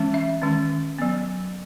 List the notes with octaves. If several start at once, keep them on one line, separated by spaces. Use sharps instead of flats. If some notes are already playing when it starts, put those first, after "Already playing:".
Already playing: E3 G#3 C#4
E5
D#3 G#3 C#4
F#3 B3